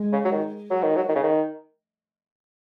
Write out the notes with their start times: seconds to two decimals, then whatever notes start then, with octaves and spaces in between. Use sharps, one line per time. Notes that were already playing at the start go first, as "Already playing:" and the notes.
Already playing: G#3
0.12 C#3
0.25 F#3
0.32 D#3
0.71 F#3
0.83 D#3
0.96 F#3
1.09 D#3
1.15 C#3
1.23 D#3